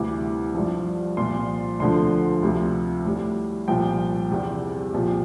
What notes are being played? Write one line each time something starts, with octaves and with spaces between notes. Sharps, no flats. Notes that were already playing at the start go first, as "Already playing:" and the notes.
Already playing: D2 C3 E3 G3 D6
G2 F3
C2 A#2 F3 C6
D2 D3 F3 C6
D2 C3 F3
A2 G3
C2 A#2 F3 G5
E2 C3 G3
C2 A#2 F3